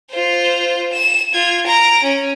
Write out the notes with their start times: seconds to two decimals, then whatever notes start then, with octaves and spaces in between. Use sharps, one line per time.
0.11 F4 C5
0.92 E7
1.33 F4 G#6
1.66 A#5 D7
2.03 C#4